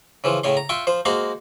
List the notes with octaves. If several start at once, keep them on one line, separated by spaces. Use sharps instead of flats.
C#3 E3 F3
A2 C#3 C#5 C6
A#5
F4 E5 G5 C6 C#6
F3 C5
G#3 A#3 F#4 C5 F5 F#5